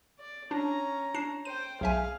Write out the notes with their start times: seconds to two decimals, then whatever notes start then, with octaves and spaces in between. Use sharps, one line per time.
0.19 D5
0.51 C#4 D4 A#5
1.14 D4 C7 E7
1.45 C5 G5 D#7
1.81 B1 G#4 E5 F5 G#5